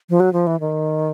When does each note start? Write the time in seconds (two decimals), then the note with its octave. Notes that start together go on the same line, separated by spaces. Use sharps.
0.10 F3
0.20 F#3
0.33 F3
0.47 E3
0.60 D#3